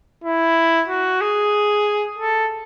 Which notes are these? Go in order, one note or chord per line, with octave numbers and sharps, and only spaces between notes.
E4
F#4
G#4
A4